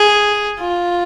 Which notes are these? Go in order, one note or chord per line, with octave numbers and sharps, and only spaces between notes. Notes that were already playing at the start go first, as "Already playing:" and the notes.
Already playing: G#4
F4